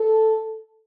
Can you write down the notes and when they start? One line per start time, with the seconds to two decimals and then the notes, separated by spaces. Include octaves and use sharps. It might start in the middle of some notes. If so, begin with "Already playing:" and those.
Already playing: A4